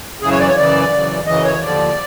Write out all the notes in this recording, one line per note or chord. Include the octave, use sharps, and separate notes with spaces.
F#2 C#3 E3 G#4
C#5
D5
C#5
F#2 C#3 E3 D5
F#2 C#3 E3
F#2 C#3 E3 D#5
C#5
D#2 D3 F3 D5